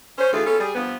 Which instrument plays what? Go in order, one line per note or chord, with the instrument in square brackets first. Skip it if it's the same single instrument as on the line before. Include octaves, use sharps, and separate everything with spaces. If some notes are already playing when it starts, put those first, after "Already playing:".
[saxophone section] C#4 C5
D2 E3 F4 G#4 A4
B3 C#4 F4 A4
G3 G#4
G2 F3 B3